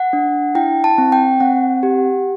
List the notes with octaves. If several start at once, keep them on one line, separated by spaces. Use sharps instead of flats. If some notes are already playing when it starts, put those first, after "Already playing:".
Already playing: F#5
D4
E4 G5
A5
C4
G5
C4 F#5
G4